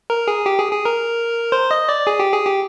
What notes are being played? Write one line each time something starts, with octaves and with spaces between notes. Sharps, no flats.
A#4
G#4
G4
G#4
G#4
A#4
C5
D#5
D5
G#4
G4
G#4
G4